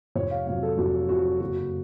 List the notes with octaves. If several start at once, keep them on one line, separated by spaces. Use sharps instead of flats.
F1 C#5
F5
F2 C3 F#3 F5
A4
F1 F#4
F2 C3 F#3 F#4
F#1 F#4